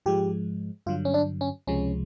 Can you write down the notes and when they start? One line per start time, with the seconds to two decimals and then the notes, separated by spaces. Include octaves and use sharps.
0.06 G#2 F3 G#3 G4
0.86 G2 D3 F#3 F4
1.05 C#4
1.14 D4
1.41 C#4
1.67 C#2 C3 F3 G#3 C#4